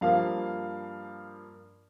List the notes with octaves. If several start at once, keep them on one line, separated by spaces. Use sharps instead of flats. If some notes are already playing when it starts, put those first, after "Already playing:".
G2 F3 A#3 F5